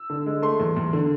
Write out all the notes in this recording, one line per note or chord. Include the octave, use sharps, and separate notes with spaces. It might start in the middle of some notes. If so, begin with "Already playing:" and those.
Already playing: E6
D3
G#3
A3 C6
E2
E2
D3